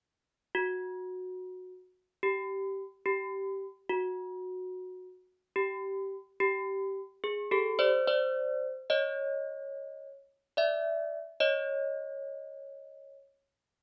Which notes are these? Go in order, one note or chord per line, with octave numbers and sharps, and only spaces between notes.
F#4
G4
G4
F#4
G4
G4
G#4
G4 A4
C5 D5
C5 D5
C#5 D#5
D5 E5
C#5 D#5